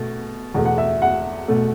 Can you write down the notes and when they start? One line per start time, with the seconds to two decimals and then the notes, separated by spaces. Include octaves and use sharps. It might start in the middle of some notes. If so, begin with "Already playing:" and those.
Already playing: B2 A3
0.54 E2 B2 A3
0.65 F#5
0.78 E5
1.02 F#5
1.48 B2 A3